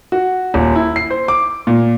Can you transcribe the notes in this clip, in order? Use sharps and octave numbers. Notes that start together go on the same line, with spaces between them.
F#4
D#1
E4
C7
C5
D6
A#2